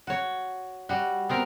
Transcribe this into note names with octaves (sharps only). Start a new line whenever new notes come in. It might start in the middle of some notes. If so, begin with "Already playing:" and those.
F#4 C#5
G3 F#4
B3 C4 A#4